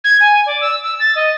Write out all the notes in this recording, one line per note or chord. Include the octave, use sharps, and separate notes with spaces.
G#6
G#5
D5
E6
E6
A6
D#5